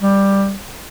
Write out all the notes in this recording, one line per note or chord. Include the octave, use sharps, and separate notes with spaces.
G3